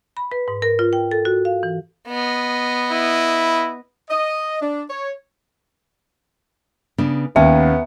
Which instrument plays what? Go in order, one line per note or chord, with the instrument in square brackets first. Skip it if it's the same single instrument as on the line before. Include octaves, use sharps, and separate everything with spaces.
[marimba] B5
B4
G#2
A#4
F4
G5
A4
F#4
F5
E3
[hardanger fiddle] B3 D#5
[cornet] E4
[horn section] D#5
D4
C#5
[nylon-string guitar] C#3 B3 D4
[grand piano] D#2 [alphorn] B3 [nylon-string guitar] C#4 [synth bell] E5